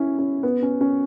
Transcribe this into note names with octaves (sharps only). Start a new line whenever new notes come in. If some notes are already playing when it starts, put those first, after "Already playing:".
Already playing: C#4 E4
C#4
B3
C#4
C#4